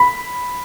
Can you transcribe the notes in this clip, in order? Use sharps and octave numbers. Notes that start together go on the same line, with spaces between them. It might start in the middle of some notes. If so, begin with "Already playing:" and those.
Already playing: B5